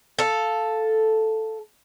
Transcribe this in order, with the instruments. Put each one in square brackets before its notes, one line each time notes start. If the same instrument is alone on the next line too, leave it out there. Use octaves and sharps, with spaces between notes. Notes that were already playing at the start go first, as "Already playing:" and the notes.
[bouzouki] A4 F5